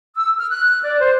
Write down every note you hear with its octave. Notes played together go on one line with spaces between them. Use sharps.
E6
F6
F#6
D5
C5